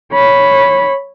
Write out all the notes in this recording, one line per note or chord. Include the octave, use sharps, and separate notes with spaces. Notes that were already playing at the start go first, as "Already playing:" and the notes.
C#5 B5